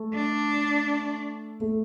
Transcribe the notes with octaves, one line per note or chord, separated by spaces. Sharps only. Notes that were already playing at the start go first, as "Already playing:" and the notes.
Already playing: A3
D4
A3